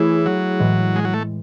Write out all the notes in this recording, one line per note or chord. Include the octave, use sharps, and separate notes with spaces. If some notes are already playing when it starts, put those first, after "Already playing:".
Already playing: E3 A3 E4 G#4 C#5
F#3
A2 E3 G#3
G#3
F#3
A3